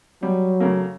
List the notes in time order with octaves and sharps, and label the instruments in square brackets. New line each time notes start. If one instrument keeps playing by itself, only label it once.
[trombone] F#3 [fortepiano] G3
[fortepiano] C#3 A3 A#3